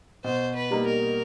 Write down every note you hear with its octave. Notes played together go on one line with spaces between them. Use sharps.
B2 C5
B4
G3 A#3 D#4
A#4